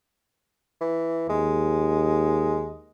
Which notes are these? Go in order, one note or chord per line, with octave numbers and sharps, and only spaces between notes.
E3
D#2 G#3